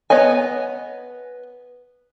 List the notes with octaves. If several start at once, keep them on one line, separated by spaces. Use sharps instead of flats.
B3 C#5 D#5 G#5